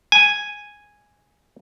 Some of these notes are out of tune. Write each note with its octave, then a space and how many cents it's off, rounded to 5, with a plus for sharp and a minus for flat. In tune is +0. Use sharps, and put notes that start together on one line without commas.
G#5 -5